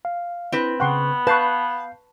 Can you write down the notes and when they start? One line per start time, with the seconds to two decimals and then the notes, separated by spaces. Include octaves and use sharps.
0.05 F5
0.52 C4 E4 B4
0.80 C#3 B3 F#5 G5 C6 C#6 F#6
1.27 B4 F5 A5 C#6 G6 C7